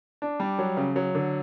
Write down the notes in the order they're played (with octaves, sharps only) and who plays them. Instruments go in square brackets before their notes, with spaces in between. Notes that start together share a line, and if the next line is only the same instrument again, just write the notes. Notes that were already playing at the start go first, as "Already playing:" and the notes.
[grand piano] D4
G3
F#3
C#3
F#3
D3